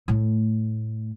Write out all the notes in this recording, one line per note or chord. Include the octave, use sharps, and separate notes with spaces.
A2 A3